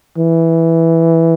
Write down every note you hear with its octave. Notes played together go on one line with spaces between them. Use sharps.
E3